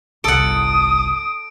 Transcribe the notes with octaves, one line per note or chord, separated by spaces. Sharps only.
G1 C2 A4 F#5 D#6 D7